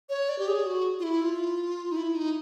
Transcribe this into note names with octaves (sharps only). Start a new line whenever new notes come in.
C#5
D5
G4
G#4
F#4
F4
E4
F4
D#4
E4
D#4